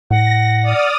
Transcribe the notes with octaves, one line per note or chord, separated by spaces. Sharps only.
A2 F#5 A#6
D5 D#6 F6